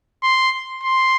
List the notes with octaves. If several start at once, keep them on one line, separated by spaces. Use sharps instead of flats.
C6
C6